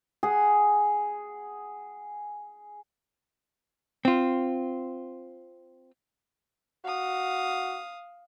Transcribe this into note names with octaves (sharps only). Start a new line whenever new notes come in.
G#4 F#5
C4 F4
F#4 F5 D#6